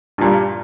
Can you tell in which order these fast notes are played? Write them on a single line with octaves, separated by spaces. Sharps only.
G2 A#2 G3